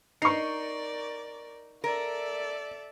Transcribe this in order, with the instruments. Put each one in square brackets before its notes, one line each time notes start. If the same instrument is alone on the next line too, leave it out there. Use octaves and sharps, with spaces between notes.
[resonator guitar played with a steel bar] D#4 [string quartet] A#4 D5 [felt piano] C#6 C7
[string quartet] A4 D5 E5 [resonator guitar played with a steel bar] A#4